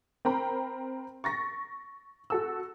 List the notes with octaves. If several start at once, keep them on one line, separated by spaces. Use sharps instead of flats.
C4 A#4 G5 A#5 B5
C#6 A6 A#6
F#4 A4 E6